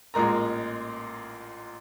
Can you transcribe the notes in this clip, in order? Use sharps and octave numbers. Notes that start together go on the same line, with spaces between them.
A1 A#2 G#3 A#4 A#5